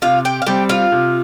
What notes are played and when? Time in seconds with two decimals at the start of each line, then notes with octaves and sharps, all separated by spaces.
0.02 C3 F4 F5
0.25 G4 G5
0.42 F5
0.46 G3 C4 G4 G5
0.69 F4 F5
0.92 C3